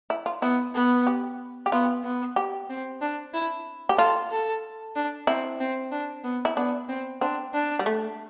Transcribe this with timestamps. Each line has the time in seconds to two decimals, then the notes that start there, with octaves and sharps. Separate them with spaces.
0.10 E4
0.26 F4
0.42 B3 E4
0.74 B3
1.07 G4
1.66 G4
1.72 B3 F4
2.04 B3
2.36 G4
2.69 C4
3.01 D4
3.34 E4
3.89 G4
3.97 F4 A4
4.31 A4
4.96 D4
5.27 C4 E4
5.60 C4
5.92 D4
6.24 B3
6.45 E4
6.56 B3 D4
6.89 C4
7.21 C4 D4
7.53 D4
7.79 G3
7.86 A3